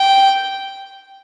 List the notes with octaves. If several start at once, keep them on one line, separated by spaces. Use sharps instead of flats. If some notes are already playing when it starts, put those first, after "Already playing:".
Already playing: G5